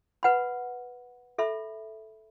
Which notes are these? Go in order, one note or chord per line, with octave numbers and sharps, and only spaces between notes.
B4 F#5 B5
A4 E5 B5